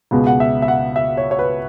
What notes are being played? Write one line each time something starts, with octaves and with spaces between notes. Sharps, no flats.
C#2 B2 G#3 B3
F#5
E5
E5
F#5
E5
C#5
C#5
B4